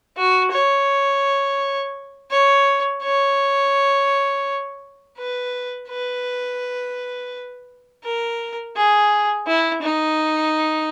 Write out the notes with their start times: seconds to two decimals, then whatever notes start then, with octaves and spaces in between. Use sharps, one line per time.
0.17 F#4
0.52 C#5
2.31 C#5
3.03 C#5
5.18 B4
5.89 B4
8.05 A#4
8.76 G#4
9.47 E4
9.83 D#4